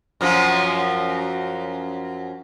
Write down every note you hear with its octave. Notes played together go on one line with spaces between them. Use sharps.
F#2 F3 F#3